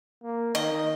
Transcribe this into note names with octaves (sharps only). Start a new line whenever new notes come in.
A#3
D#3 D#5